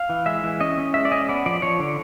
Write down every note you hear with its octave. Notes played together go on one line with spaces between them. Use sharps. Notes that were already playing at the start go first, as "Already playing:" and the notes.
Already playing: F5
E3
G#3 E5
E3
C#4 D#5
C#4
G#3 E5
D5
C#4 D#5
B3 D5
F3 D5
F3 C#5
D3